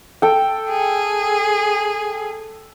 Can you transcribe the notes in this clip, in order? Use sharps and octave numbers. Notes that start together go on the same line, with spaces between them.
A4 G5
G#4